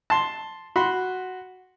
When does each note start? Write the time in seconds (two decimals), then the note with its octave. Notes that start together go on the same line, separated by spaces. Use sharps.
0.10 A5 C6
0.76 F#4 B5 C6